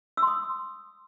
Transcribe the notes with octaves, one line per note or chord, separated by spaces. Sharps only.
C6 D#6 E6